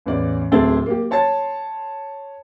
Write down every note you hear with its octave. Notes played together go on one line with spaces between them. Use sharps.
A1 E2 D5
D1 A3 C4 G#4 A6 G7
A#3 G4
C#5 A5 C6 A6